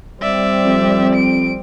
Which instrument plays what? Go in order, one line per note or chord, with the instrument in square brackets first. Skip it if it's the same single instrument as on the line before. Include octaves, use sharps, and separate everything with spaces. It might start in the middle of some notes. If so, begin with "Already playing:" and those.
[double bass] G3 C4 [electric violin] D5 E5
[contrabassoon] F2
[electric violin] D7